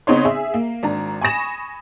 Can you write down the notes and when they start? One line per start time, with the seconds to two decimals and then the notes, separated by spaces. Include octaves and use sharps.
0.07 C#3 B3 C4 D#4 C#5 C6
0.25 G#4 E5
0.54 A#3
0.83 G#1 D4 A#5
1.22 G#5 B5 C#6 D#6 A#6 E7